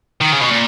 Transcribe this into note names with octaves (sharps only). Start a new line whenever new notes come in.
D#3
C#3
B2
A#2